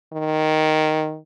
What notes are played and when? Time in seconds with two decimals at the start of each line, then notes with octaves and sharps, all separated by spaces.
0.13 D#3